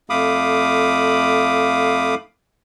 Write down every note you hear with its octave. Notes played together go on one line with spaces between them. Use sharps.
F2 A3 F5 B5 D6 D#6